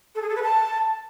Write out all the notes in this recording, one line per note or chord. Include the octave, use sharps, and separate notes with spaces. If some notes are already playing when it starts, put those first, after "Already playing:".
A4
G#4
A4
B4
A5